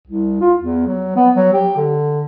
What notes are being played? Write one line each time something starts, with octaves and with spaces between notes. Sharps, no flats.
C2
F4
E2
F#3
B3
F#3
G4
D3